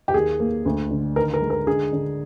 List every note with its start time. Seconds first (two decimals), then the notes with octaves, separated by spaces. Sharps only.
0.08 G4
0.14 D#2 G#4
0.40 A#3
0.66 D2
0.91 D3
1.16 D#3 A#4
1.34 A#4
1.42 G#3
1.50 A#4
1.67 D3 G#4
1.93 D3